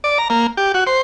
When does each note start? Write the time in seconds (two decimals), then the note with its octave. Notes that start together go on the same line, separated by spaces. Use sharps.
0.04 D5
0.18 A#5
0.30 A#3
0.57 G4
0.74 F#4
0.87 C5